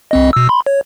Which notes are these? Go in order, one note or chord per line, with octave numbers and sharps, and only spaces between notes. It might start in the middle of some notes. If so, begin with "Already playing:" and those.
C2 C4 D#5
B2 E6
B5 C6
C#5